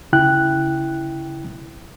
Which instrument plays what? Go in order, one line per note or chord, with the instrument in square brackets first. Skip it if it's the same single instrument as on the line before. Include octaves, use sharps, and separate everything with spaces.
[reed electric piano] D2 C#3 E4 G5 F#6